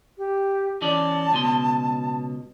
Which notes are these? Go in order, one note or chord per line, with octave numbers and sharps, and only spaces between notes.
G4
E3 C#4 D5 A5
C#2 B2 C6